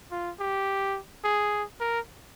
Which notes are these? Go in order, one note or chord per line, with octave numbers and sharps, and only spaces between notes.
F4
G4
G#4
A#4